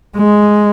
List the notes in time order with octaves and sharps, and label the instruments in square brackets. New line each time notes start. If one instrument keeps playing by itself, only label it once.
[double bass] G#3